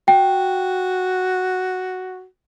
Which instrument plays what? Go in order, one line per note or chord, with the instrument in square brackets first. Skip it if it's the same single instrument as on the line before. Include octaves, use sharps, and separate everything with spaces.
[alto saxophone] F#4 [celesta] G5